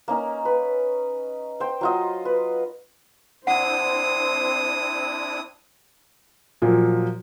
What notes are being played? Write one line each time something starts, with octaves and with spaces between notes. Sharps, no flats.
A#3 C#4 D#4
B4
C5 G5
F#3 F4 D#5
B4
C4 D4 E4 C5 F#5 D#6
A#2 F3 F#3